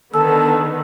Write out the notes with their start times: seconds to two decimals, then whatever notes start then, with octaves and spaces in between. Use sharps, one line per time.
0.14 D3 D#3 B3 A4 A5 E6